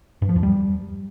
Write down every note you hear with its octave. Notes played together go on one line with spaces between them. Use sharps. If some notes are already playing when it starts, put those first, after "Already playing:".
G2
F3
E2
G3